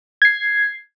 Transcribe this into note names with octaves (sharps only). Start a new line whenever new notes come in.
G#6 C7